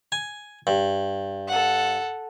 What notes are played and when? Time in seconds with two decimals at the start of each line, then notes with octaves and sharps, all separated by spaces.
0.12 G#5
0.67 G2
1.47 A4 F#5